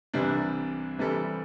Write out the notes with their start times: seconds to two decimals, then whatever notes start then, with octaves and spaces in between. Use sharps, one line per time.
0.14 C2 C3 E3 G3 D4
0.98 C3 E3 G3 C4 A4